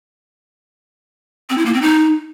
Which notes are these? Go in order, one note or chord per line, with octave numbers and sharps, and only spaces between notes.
C4
E4
A#3
C4
D#4